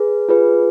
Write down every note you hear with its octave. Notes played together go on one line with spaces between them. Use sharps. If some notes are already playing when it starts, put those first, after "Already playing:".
Already playing: G#4 B4
F4 G#4 B4